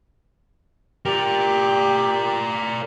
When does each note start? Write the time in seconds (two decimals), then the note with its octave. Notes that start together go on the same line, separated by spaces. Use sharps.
1.06 G4 A#4 D5